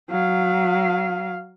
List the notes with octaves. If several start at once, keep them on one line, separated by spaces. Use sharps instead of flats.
F#3 F5